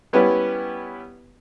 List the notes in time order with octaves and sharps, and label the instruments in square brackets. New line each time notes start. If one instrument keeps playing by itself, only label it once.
[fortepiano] G3 B3 C#4 E4 G4 B4